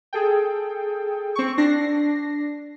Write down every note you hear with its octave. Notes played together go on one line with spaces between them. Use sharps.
G#4 A4 G5
C4 C#6
D4 A#6 C7